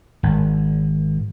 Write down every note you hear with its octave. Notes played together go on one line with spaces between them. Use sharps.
G#1